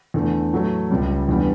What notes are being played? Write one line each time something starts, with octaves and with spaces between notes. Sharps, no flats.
E2 D3 A3
A2 F#3 A3
C#2 C#3 G3
E2 D3 G3 B3